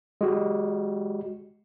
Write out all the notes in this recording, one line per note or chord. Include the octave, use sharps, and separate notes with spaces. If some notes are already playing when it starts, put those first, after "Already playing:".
G#3 F#4 G4